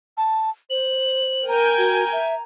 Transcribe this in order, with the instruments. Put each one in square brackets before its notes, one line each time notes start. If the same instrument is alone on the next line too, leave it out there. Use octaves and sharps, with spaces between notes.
[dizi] A5
[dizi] C5 [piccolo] F#7
[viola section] A#4 G5 G#5 [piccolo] A#5
[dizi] F#4
E5